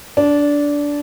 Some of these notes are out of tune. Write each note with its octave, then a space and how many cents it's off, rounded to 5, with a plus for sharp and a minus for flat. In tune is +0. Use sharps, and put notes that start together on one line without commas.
D4 -15